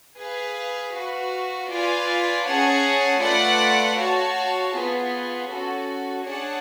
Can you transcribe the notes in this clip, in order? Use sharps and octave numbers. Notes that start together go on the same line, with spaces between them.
G#4 B4 F5
F#4 B4 F5
F4 B4 D5 F5 G#5
C#4 G#4 C#5 F#5 A5
A3 F4 B4 D5 F#5
F#4 C#5 F5 A5
B3 F4 G#4
C#4 F#4 A4
D4 G#4 C#5 F#5 A5